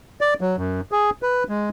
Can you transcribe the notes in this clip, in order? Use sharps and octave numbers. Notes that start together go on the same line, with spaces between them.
D5
F#3
F#2
G#4
B4
G#3